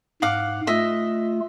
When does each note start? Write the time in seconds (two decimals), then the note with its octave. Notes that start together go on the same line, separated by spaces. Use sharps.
0.22 G#2 F5 F#5 D6
0.67 A3 F4 D#5 E5